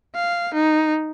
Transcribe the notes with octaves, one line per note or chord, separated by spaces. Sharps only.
F5
D#4